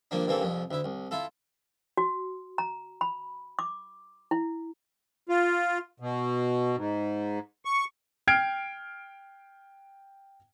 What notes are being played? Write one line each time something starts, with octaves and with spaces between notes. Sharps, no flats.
G2 F3 A#3 D4
G2 E3 A#3 C4 A4
C2 F2 F3
D2 E4
C2
E4 F4 A4
F#4
A#5
B5
D6
E4
F4
B2
G#2
C#6
G5 F6 G#6 C7 D7